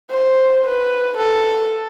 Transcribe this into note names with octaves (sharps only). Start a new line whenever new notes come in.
C5
B4
A4